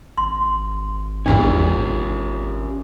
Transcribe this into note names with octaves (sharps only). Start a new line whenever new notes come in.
G#1 C6
A#1 E2 G#2 C#4 D4 G4 A#4